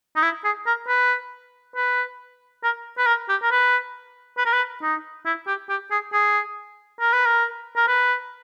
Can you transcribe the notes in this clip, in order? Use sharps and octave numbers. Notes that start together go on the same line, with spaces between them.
D#4
E4
G#4
A#4
B4
B4
A#4
B4
A#4
G4
A#4
B4
B4
A#4
B4
D#4
E4
G4
G4
G#4
G#4
A#4
B4
A#4
A#4
B4